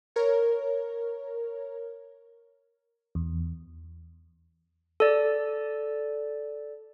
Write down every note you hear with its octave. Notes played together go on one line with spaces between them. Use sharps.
A#4 C#5
E2
A4 D5